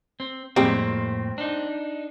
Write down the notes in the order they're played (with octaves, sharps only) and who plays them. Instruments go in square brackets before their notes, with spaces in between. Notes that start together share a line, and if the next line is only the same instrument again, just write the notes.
[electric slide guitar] C4
[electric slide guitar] F2 A2 A#3 [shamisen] G3 G#3 [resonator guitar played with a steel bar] C4
[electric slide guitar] D4 D#4